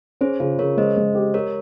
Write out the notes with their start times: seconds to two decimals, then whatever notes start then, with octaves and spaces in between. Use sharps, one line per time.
0.21 C#4 G#4 C5
0.40 C#3 F4
0.59 C#3 A#4 C#5
0.77 G#3 C5 D#5
0.97 G#3
1.15 G4
1.34 G4 A#4 C#5